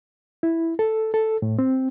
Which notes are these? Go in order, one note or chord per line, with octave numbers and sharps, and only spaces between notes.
E4
A4
A4
A2
C4